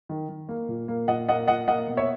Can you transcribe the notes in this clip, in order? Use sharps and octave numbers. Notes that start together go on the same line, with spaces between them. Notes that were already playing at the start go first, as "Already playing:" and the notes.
D#3
D#3
A#3
A#2
A#3
A#2 D#5 F#5
A#3 D#5 F#5
A#2 D#5 F#5
A#3 D#5 F#5
B2
C#5 E5